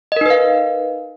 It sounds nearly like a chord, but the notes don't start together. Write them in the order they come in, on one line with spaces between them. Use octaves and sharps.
D#5 A#4 D#4 B4 F5